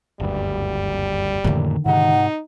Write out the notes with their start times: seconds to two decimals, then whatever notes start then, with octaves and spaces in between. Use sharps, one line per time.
0.20 F#1 D2 G2 G3
1.44 F2 A2 D3 D#3 A#3
1.86 G#2 C3 D#4 F#5